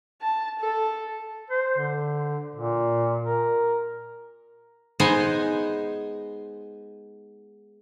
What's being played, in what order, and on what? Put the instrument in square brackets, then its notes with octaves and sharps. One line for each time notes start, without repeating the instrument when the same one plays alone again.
[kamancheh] A5
A4
[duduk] C5
D3
A#2
A#4
[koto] G#3 B3 D#4 C5 D#5 G#5